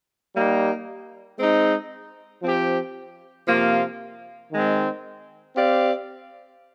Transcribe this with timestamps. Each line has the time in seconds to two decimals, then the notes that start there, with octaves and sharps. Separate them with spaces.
0.34 G3 A#3 D#4
1.38 G#3 C4 D#4
2.42 F3 C4 G4
3.47 C3 F3 A#3 F4
4.51 D#3 G#3 C4
5.56 C4 G4 D5 F5